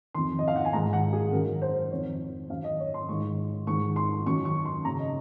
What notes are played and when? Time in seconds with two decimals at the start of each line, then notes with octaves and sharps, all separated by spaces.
0.14 F2 D#3 C6
0.39 D#5
0.48 F5
0.56 F#5
0.65 G#5
0.73 G#2 D#3 A#5
0.93 F#5
1.13 G#4
1.32 F#2 D#3 A#4
1.62 C5
1.90 F2 D#3 C#5
2.49 F#2 F5
2.53 D#3
2.64 D#5
2.80 C#5
2.94 C6
3.09 G#2 D#3 C#6
3.67 G#2 D#3 C#6
3.96 C6
4.26 F#2 D#3 C#6
4.45 C#6
4.65 C6
4.85 F#2 C#3 A#5
4.99 D#5